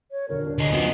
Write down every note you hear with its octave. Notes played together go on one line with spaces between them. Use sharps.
C#5
D#1 D3 A#4 C#5
D4
D2 G#4 D#5
F#2 F3 B3 A#4